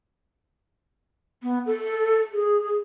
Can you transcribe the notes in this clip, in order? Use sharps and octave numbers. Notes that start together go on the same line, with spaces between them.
B3
A4
G#4